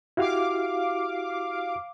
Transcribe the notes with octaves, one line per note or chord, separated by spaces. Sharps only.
E4 F#4 G4 F5 D6